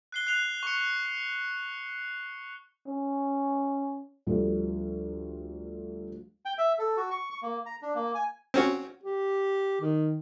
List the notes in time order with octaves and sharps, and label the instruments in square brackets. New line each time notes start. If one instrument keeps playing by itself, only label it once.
[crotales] F#6 C7 G7
F#6 C7 F7 G7
C#6 C#7
[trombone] C#4
[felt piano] D2 F3 G3 A4
[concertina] G5
E5
A4
F#4
C#6
C#6
A#3
A#5
D4
A#3
G#5
[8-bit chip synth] C4 C#4 F#4
[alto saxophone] G4
D#3